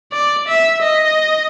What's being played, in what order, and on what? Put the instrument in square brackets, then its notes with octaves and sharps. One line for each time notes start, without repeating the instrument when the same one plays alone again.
[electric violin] D5
E5
D#5